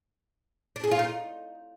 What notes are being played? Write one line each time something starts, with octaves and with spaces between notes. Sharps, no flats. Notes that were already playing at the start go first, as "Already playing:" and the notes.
D4
G#4
F4
D#4